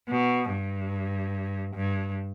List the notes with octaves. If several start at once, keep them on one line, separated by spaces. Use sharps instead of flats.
B2
G2
G2